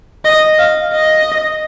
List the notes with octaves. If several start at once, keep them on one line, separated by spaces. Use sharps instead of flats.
D#5
F5
D#5